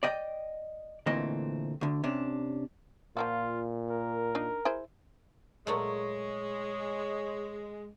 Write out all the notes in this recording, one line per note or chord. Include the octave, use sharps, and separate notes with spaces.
D5 D#5 G5
D2 A#2 E3 A3 C4 D#5
D2 D3
C3 C#4 D4
A#2 F3 A#3 F4 F#4
A#4
D4 D#4
E4 G#4 C5
A#2 F#3 G#3 A3 C#5